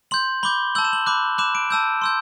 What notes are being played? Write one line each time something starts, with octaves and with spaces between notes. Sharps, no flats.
C6 G6 F#7
B5 D6 G6 G7
A5 E6 G6 F#7
E7
F#7
B5 D6 F#6
B5 D6 F#6 E7
D7
A5 E6 G6
C6 E6 G6